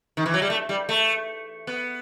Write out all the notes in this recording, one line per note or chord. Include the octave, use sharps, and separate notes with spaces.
D#3
E3
F#3
G3
A3
G3
A3
B3